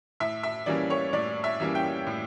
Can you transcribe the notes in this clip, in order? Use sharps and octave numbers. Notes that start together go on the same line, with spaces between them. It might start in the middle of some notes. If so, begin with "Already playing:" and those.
A2 E5
E5
E3 G3 A#3 C#4 D5
C#5
A2 D5
E5
E3 G3 A#3 C#4
G5
A2